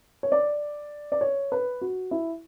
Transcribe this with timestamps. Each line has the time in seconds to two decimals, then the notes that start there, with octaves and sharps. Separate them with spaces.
0.23 C#5
0.32 D5
1.12 D5
1.21 C#5
1.52 B4
1.81 F#4
2.11 E4